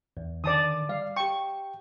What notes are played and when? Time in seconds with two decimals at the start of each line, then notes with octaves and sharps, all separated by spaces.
0.17 E2
0.44 D3 D#3 D5 A5 D#6
0.89 G3 D5 F5
1.16 G4 G5 C#6